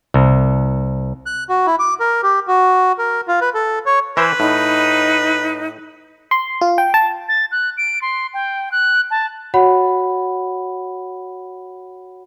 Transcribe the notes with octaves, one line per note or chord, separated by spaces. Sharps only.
C2
F#6
F#4
E4
D6
A#4
G4
F#4
A#4
F4
B4
A4
C#5
E3 E4 B4 C5
A2 D#4
C6
F4
G5
A5
A6
F#6
D7
C6
G5
F#6
A5
F#4 C#5 F#5 B5